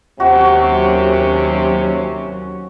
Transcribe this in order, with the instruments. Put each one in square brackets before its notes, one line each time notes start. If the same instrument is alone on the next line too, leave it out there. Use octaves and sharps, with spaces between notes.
[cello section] D#2 F#3 C#4 [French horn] C3 [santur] F#4